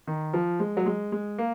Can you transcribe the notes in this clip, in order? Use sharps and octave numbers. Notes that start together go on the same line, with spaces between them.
D#3
F3
G#3
F#3
G#3
G#3
A#3